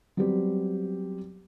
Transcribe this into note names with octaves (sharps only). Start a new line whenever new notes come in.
F#3 G3 B3 C4 G4